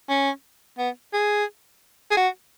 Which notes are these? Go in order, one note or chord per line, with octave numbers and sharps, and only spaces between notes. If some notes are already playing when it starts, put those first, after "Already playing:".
C#4
B3
G#4
G#4
F#4